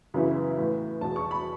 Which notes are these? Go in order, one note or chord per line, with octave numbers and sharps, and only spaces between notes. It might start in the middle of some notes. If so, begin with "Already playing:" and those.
F#2 C#3 E3 B3 E4
A2 E3 B3
E1 E2 B2 A5
C#6
B5